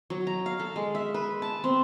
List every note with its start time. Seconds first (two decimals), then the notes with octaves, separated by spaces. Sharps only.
0.10 F#3
0.27 A#5
0.46 F5
0.60 A4
0.76 G#3
0.95 E5
1.14 B4
1.42 A5
1.64 C4